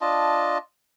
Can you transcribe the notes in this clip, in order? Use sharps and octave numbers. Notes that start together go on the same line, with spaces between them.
D4 F4 D#5 A5